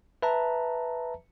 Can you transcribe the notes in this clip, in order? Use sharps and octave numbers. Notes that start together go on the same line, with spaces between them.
B4 E5 A5 A#5